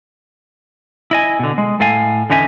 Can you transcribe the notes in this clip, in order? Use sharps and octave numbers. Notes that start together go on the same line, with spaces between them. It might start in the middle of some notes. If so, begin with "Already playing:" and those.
E4 D#5 G#5
B2 D3
G#3
A2 A4 F5 G#5
E2 D3 C#4 D#4 E5 G#5